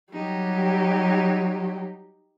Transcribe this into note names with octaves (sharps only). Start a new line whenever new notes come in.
F#3 G3 D#4 G4